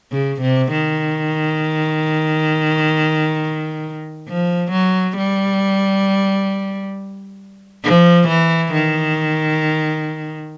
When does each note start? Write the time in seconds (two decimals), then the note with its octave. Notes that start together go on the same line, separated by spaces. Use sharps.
0.12 C#3
0.42 C3
0.72 D#3
4.28 F3
4.71 F#3
5.17 G3
7.84 F3
8.28 E3
8.73 D#3